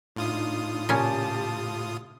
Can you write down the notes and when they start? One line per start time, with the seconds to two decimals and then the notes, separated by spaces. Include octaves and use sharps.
0.16 A2 D4 D#4 F4 D#6
0.89 A#2 C#3 C#4 G4 A5